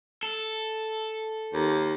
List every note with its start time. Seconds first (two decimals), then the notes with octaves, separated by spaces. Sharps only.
0.23 A4
1.53 D#2